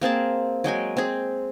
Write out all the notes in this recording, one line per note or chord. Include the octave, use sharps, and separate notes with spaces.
A#3 C4 G#4 A5
F#3 G#3 G5 G#5
C4 G#4